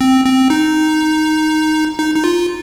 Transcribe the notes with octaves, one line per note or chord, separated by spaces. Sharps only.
C4
C4
D#4
D#4
D#4
F4